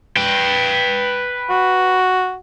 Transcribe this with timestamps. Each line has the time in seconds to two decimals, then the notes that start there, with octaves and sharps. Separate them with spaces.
0.17 B4 G5
1.50 F#4